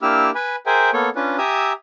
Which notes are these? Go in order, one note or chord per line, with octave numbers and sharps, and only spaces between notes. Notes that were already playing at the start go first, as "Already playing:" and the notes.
A#3 D4 E4 G4 E6 F6
B4 G#5 B5
G#4 A#4 C5 E5 G5 G#5
A#3 B3 A4 C#5
C#4 D4 F4 B4
G4 E5 G#5 A#5 D#6 E6